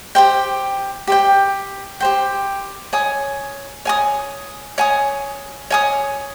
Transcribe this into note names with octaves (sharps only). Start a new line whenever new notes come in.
G4 C5 G5
G4 C5 G5
G4 C5 G5
C#5 G#5 D#6
C#5 G#5 D#6
C#5 G#5 D#6
C#5 G#5 D#6